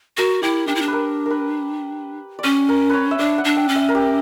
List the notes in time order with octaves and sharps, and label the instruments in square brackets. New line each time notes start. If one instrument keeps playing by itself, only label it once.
[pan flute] F#4 [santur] A#4
[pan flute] E4 [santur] G4
[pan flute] D4 [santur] G4
[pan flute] E4
D4
[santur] B4
A#4
A#4 B4
D5
[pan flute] C#4 [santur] C#5
[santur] A#4
B4 C#5
E5
[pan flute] D4 [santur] D5
[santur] F#5
[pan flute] D4
[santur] G5
[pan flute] C#4
[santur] E5
A#4
G4